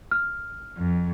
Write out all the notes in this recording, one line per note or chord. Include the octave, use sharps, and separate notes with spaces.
F6
F2